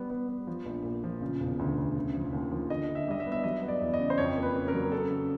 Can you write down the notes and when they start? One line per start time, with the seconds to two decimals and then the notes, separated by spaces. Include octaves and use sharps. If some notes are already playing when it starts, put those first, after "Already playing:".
Already playing: G3 B3
0.10 B3
0.29 B3
0.47 F3
0.65 A#1
0.84 A#2
1.04 F3
1.21 C#3
1.40 E1
1.59 D2
1.78 D2
1.95 C#3
2.15 F3
2.33 D#2
2.51 F3
2.69 D3 D#5
2.89 D3
2.95 E5
3.08 G3 D#5
3.20 E5
3.26 B3
3.32 E5
3.44 F#3 D#5
3.62 B3
3.68 D5
3.81 E2
3.94 D#5
4.00 C#3
4.10 C5
4.18 F2 C#5
4.37 A#3
4.43 B4
4.55 C#3
4.68 A#4
4.74 F#3
4.92 C#3 A4
5.11 C#3